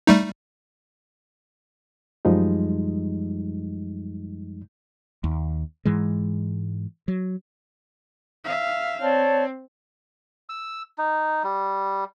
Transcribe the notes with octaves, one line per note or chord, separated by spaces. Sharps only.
G3 A3 D#4
F#2 F3 G3 G#3 D#4
D#2
G#2 E3 G#3
F#3
E5 F5
C4 C#5 D5 A5
E6
D#4
G3